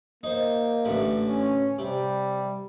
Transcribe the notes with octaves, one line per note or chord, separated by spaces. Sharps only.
A#3 D#4 C5
A1 D3 E5
C#4
C3 G3